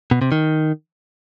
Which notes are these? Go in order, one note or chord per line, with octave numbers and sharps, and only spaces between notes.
B2
C3
D#3